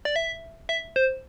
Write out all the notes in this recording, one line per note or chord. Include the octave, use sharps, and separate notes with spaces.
D5
E5
E5
C5